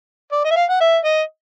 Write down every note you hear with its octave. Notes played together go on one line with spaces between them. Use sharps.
D5
D#5
E5
F5
F#5
E5
D#5